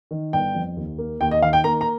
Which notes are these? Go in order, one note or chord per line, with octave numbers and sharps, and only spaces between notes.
D#3
G1 G5
F2
D#2
A#3
D#2 G5
D#5
D#3 F5
G5
A#3 A#5
A#5